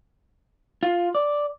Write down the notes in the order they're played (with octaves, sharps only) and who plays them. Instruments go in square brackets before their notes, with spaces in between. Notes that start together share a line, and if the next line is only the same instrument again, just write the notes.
[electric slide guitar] F4
D5